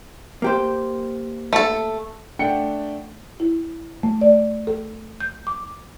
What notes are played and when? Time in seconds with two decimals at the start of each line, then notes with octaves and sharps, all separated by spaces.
0.42 A#3 G4 C5
1.53 A3 A4
2.39 A3 D4 F#5 G5 C#7
3.40 E4
4.03 A3
4.21 D5
4.67 A4
5.20 G6
5.47 D6